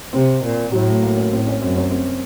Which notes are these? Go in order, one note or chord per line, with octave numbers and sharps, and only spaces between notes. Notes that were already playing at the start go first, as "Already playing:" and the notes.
C3 C4
A#2
A2 F#3
A3
A#3
C#4
A2 C4
C#4
F#2 C4
C#4
C4